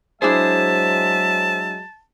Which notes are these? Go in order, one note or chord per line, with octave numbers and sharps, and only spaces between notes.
F#3 G#3 D4 E4 G#4 C5 E5 A5